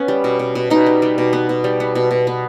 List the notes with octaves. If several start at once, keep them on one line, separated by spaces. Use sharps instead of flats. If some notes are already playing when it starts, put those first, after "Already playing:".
Already playing: B3 C#4
G3
B2
B2
B2
B2 D#4
G3
G3
B2
B3
B2
G3
B3
B2
B2
B3